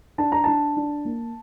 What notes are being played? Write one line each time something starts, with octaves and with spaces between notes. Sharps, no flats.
D4 A5
A#5
D4 A5
D4
A#3